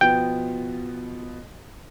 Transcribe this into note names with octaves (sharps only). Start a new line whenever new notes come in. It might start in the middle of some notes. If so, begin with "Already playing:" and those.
B2 F3 B3 G5